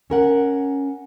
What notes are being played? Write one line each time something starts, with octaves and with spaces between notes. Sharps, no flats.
C#4 A#4 F#5